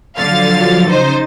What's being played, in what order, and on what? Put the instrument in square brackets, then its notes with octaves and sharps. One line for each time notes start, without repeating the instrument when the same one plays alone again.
[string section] D3 F5 A6 [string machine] F3 F#3
[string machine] C#3 A6 [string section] D#4 C5